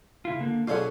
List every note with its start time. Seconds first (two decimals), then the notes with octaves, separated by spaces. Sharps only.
0.25 C#3 E4 F4
0.40 D3 A#3
0.68 B2 D3 F#3 F4 G#4 A4